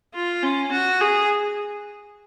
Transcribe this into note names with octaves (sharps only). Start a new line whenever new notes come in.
F4
C#4
F#4
G#4